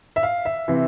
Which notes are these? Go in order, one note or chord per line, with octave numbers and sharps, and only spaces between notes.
E5
F5
E5
C3 E3